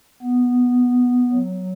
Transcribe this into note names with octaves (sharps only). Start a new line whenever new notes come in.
B3
F#3